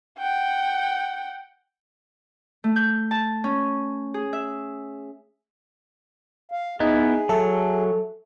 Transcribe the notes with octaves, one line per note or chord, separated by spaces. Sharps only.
F#5 G5
A3
G6
A5
C#4
G#4
E5
F5
B3 D#4 E4 G#4
F#3 A4 E5